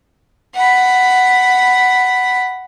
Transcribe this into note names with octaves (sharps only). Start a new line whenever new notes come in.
F#5 B5